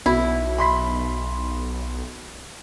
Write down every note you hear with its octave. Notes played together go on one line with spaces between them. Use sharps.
B1 B2 E4
B5 C6 B6